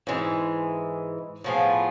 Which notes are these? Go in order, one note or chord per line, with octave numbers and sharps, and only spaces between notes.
G#2 E3 G#3
A2 F3 B3 F4 G#4